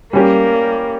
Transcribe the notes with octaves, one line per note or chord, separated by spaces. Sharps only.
G3 A#3 C#4 G4